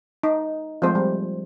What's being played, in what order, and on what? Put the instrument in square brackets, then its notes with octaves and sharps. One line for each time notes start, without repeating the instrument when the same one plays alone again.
[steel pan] D#4
F3 G#3 A3 C4 C5
G3